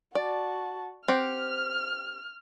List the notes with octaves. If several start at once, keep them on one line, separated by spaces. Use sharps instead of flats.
F#4 D5 A5
C4 G4 F#5 F6